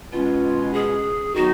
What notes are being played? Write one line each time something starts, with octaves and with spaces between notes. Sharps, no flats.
B2 G#3 C#4 F4
G#4
D#3 F#3 B3 D#4 F#4